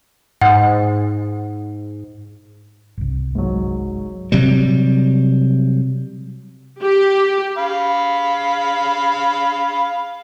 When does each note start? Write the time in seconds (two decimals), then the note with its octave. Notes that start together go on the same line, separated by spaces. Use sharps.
0.41 G#2 F#5
2.97 G1 C2
3.35 G#2 F#3
4.32 C3 F#3 G3
6.82 G4
7.58 F5 B5